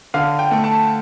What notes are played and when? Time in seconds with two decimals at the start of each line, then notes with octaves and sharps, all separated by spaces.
0.14 D3 F5
0.39 G5
0.51 A3
0.64 A5